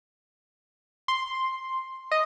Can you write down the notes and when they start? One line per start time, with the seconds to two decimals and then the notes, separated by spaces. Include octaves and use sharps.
1.08 C6
2.11 D#5